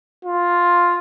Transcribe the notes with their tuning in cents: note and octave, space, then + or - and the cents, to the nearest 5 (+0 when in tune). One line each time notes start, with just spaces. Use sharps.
F4 +5